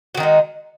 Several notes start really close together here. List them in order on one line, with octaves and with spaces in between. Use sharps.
F#4 D#3 D#4 G#3